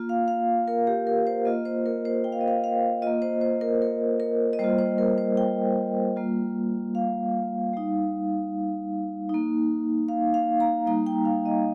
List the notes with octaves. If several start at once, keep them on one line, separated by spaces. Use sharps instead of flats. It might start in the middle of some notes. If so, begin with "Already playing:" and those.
Already playing: A#3 F4
F5
F5
A#4
G4
A#4
C5
A#3 F4 D#5
C5
A#4
C5
G5
F5
D#5
F5
F5
A#3 F4 D#5
C5
C5
A#4
A#4
A#4
D#5
G3 A#3 F4 C5
C5
A#4
C5
G5
G3 A#3 F4
F5
G3 D#4
D#4
A#3
F5
F5
A#5
G3 A#3 D#4 A#5
G5
F5
D#5